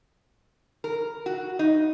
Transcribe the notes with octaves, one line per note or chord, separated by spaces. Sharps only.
A#4
F#4
D#4